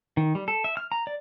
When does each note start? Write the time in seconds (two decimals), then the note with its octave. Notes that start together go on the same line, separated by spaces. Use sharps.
0.17 D#3
0.35 G3
0.48 A4
0.64 E5
0.77 F6
0.92 A#5
1.07 D5